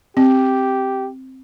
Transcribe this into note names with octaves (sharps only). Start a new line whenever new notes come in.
C4 G4